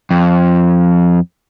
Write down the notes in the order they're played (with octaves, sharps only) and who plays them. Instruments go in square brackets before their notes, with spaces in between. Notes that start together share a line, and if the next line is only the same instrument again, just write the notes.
[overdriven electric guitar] F2